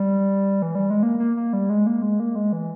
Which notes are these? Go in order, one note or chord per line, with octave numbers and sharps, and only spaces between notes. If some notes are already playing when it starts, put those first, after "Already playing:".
Already playing: G3
E3
G3
G#3
A#3
A#3
A#3
G3
G#3
A#3
G#3
A#3
G#3
E3